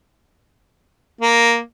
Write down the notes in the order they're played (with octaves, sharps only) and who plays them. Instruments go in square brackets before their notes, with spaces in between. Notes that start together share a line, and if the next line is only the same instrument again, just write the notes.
[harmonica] A#3